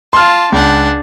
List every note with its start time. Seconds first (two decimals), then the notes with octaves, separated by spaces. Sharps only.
0.13 F4 A5 C6 F6
0.52 C#2 D4 F#5